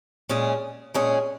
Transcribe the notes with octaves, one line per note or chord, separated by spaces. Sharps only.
A#2 G#3 C#4 G#4
A#2 G#3 C#4 G#4